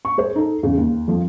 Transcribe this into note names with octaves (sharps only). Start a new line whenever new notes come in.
C#6
G#4 C5
D#4 A4
E2 C#3
D#2
F2 F3